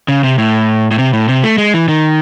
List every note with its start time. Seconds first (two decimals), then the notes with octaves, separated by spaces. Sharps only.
0.08 C#3
0.24 C3
0.38 A2
0.91 A2
0.98 C3
1.13 A2
1.29 C3
1.44 A3
1.58 G#3
1.74 E3
1.88 D#3